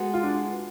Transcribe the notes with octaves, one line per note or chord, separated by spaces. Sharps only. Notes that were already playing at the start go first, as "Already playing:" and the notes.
Already playing: G#3 B3 F#4 A4
F4
D4